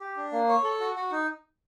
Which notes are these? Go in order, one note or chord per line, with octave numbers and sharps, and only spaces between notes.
G4
D4
A#3
C#5
A4
F#4
F#4
D#4